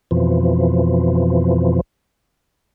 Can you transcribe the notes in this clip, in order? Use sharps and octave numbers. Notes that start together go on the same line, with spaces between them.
F2 B2 E3 F3